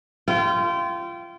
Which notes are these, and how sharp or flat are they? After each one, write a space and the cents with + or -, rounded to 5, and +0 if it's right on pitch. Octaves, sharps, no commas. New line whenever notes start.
F4 -25 G5 -25